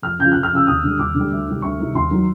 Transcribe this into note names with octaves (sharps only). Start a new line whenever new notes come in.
F2 F6
C#3 F3 G6
F2 F#6
F6
C#3 F3 E6
D#2 D#6
D3 G3
D#2 D6
D3 G3
D2
C3 D#3 G3
D2 C#6
C3 D#3 G3
D#2 C6
D#3 F#3